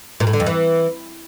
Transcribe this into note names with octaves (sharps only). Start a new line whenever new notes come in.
A#2
A2
D3
F2
E3